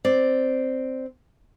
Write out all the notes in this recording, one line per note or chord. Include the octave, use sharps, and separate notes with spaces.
C4 D5